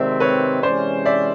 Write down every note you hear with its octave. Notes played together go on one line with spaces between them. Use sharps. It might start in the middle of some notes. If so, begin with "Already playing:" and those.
Already playing: C3 D#3 G#3 C4 D5 E5
B4 C#5
C3 E3 G#3 C#4 C5 D5
D5 E5